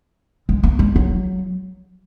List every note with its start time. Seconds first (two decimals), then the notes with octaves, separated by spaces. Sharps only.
0.49 G#3
0.63 A#3
0.79 G#3
0.96 F#3